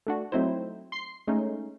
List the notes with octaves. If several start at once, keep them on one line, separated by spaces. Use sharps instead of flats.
A3 D4 F#4
F#3 A3 C4 D#4 E4 C5
C6 C7
G#3 A3 C#4 D#4